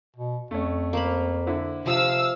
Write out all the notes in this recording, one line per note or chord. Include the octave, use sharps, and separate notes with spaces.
B2
F2 A3 C#4
A#3 C5 B5
D3 E4
C3 F3 F5 E6